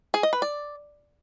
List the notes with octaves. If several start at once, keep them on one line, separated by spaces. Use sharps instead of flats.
G#4
D#5
B4
D5